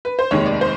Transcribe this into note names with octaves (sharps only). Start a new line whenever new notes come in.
B4
C5
F1 D#2 D#3 G#3 C#5
D5
C5